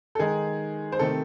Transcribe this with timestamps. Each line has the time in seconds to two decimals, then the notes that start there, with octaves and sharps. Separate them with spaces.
0.15 A4
0.19 D#3 G#3 D#4 G#4
0.92 C5
0.99 C3 D#3 A3 C4 A4